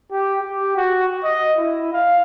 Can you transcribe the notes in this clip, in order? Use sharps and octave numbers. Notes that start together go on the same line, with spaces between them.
G4
G4
F#4
D#5
E4
F5